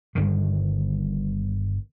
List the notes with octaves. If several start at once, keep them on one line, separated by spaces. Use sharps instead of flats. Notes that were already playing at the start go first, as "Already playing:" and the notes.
G1 G2 D3 D#3